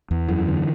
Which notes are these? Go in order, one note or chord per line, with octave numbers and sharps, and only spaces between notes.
E2
F#2 E3
D3